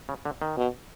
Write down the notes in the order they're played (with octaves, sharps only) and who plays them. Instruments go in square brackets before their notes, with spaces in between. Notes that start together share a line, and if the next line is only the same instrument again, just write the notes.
[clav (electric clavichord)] C#3
D3
D#3
[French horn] B2